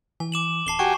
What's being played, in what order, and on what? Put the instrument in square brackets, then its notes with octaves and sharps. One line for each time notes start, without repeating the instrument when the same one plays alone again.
[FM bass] E3 [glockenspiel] G#5
[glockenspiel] D6 E7 F#7
[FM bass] D1 [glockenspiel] A5 C7 G7
[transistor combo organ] F#4 G4 G#5 [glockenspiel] C#6